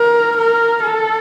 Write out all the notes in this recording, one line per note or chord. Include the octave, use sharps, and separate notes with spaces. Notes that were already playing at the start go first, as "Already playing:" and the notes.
Already playing: A#4
A#4
A4